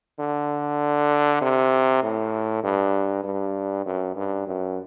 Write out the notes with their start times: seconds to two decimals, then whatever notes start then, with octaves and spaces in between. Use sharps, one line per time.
0.19 D3
1.41 C3
2.03 A2
2.64 G2
3.24 G2
3.86 F#2
4.16 G2
4.47 F#2